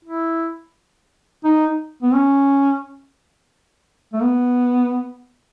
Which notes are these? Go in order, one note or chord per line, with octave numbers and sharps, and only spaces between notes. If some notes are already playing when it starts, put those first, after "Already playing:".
E4
D#4
B3
C#4
A3
B3